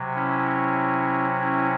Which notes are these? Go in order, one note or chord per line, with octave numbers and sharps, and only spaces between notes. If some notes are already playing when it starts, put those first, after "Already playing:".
Already playing: C3 F#3
C#4 E4
C#4 E4